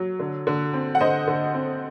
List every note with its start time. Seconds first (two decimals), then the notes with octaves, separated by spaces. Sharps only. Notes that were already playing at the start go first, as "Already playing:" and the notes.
Already playing: F#3
0.19 D3
0.47 D3
0.73 C4
0.95 F#5
1.00 D3 C5 D#5
1.27 D3
1.54 C4